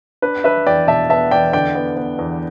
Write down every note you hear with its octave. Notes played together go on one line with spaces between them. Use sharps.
D4 B4
D4 B4 E5
E2 D5 G5
B2 E5 A5
B3 E5 A5
E2 D5 G5
D3 D5 G5
B3
B3
E2